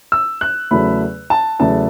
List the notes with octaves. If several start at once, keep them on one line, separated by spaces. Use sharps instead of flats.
E6
F#6
E2 C#3 F#3 A3 B5
A5
E2 C#3 F#3 A3 A5